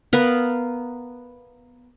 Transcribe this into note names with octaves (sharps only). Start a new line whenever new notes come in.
B3 A#4 B4 F5